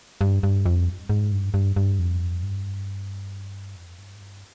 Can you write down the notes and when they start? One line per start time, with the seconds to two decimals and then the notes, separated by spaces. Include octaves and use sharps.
0.21 G2
0.43 G2
0.66 F2
1.10 G#2
1.32 G2
1.54 G2
1.76 G2
1.99 F2
2.43 G2
3.76 F2
3.99 G2
4.15 G#2
4.21 G2